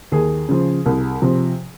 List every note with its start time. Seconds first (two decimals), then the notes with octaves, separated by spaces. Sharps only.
0.12 D#2 G#4
0.49 C#3 F3
0.86 C2
1.22 C3 F3